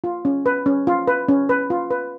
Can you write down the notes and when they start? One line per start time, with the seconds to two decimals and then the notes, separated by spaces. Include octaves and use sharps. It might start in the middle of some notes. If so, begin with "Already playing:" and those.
0.04 F4
0.25 C#4
0.46 B4
0.66 C#4
0.87 F4
1.08 B4
1.28 C#4
1.49 B4
1.70 F4
1.91 B4